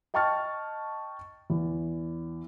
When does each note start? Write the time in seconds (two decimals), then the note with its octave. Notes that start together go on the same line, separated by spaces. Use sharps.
0.14 D#5 G5 A5 C#6 F6 A6
1.50 E2